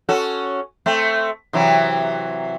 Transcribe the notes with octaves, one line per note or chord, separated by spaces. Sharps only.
C#4 F#4 A4
A3 C4
C3 E3 F#3